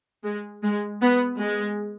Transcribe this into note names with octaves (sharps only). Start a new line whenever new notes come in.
G#3
G#3
B3
G#3